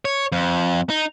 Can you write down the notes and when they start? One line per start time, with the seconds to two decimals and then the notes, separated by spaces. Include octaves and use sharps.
0.05 C#5
0.32 F2
0.90 D#4